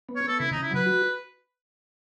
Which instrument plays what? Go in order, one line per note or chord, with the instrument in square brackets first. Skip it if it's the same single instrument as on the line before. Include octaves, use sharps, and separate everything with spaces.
[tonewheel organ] B3
[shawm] C#5
[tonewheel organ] B3 [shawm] A4
[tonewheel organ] C#3 [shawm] E4
[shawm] D#4
[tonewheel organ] C#3
[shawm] E4
[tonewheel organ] F#3 [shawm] B4
[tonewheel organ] F#4